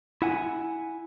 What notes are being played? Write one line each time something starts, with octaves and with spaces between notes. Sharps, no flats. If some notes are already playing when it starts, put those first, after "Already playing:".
E4 F#5 G#5